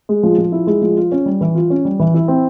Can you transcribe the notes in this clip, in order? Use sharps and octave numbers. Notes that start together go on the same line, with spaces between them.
G#3
F3
F3
E4
G#3
F3
F4
C#4
G3
E3
F4
C#4
G3
E3
E4
C4